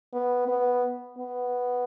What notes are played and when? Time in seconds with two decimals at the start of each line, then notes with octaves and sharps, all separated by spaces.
0.13 B3
0.48 B3
1.18 B3